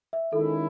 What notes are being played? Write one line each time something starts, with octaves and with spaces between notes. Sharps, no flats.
E5
D#3 G#3 C#4 E4 A4